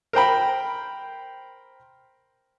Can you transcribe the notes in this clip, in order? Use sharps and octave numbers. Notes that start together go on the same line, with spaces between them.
A#4 C5 G5 B5